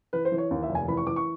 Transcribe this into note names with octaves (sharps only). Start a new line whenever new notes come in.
E3 B4
C5
E3
C#5
D#2
E5
F1
G#5
E3 B5
C#6
E3 D6
C#6